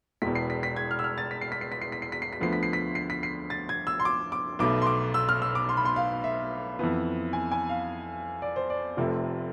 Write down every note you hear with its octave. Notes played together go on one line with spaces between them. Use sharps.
E1 E2 B2 B6
C7
B6
B6
G#6
F6
E6
F6
A6
B6
C7
B6
C7
B6
C7
B6
C7
B6
C7
B6
D2 D3 F3 B3 C7
B6
C7
B6
C7
B6
C7
A6
G#6
E6
C6
D6
D6
B1 B2 A3 D6
C6
D6
E6
F6
E6
D6
C6
B5
C6
F5
E5
F2 E3 B3
G#5
G#5
F5
D5
C5
D5
F1 F2 C3 F3 A3